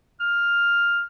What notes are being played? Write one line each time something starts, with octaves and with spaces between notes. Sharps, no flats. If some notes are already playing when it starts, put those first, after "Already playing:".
F6